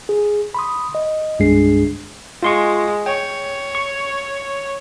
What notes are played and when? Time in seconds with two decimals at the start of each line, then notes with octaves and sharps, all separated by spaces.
0.09 G#4
0.54 B5 C6 D#6
0.95 D#5
1.39 C2 G2 G#3 D4 G#4 C7
2.43 G#3 F4 C6 C#6
3.06 C#5 G5
3.75 C#6